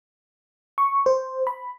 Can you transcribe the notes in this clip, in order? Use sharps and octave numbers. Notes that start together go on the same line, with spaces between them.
C#6
C5
B5